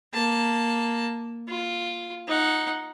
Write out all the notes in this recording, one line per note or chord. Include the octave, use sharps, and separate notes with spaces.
A#3 A5
F4
D#4 F#5